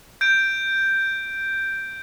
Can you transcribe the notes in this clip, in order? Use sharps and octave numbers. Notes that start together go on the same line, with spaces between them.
G6 D7